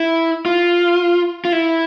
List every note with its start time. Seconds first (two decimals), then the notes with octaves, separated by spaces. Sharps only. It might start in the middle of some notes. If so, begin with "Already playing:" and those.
Already playing: E4
0.46 F4
1.45 F4
1.52 E4